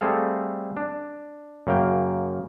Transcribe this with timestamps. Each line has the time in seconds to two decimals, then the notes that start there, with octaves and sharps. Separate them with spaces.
0.01 G3 A3 C4 G#4 A4 F5
0.77 D4
1.67 F#2 C#3 A#3 F5 G5